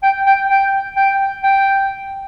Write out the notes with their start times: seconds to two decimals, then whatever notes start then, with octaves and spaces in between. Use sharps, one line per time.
0.03 G5
0.26 G5
0.50 G5
0.96 G5
1.43 G5